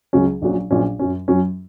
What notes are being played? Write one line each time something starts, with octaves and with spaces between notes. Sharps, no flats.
C#2 C#3 F#3 C#4
A#1 A#2 F#3 C#4
A#1 A#2 F#3 C#4
F#2 F#3 C#4
F#2 F#3 C#4